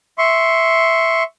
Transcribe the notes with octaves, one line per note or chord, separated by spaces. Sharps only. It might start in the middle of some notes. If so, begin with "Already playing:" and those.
E5 C6 C#6